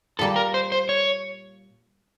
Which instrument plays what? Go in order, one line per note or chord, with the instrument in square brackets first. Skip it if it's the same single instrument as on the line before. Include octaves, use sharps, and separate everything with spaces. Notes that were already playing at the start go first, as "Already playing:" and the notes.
[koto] A#2 G3 A#3 [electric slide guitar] A4
[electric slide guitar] A#4
C5
C5
C#5